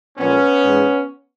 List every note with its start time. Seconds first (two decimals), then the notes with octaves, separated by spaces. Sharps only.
0.18 A#2 F3 G#3 B3 C#4
0.64 G#2 E3 G#3